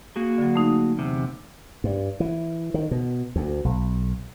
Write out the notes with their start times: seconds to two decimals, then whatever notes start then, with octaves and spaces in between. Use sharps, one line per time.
0.16 A#3 F#4 G#4
0.38 D3 F#3
0.54 D3 A3 D#4
0.99 E2 C3
1.84 G2
2.20 E3
2.74 D#3
2.91 B2
3.36 D2
3.65 B1